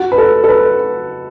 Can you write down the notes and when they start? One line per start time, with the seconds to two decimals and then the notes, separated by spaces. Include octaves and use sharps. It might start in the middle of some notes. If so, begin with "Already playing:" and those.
Already playing: F#4
0.12 B4
0.18 A4
0.44 A4
0.49 B4